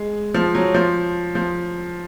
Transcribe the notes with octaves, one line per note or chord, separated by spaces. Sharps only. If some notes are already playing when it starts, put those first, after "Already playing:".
Already playing: G#3
F3
F#3
F3
F3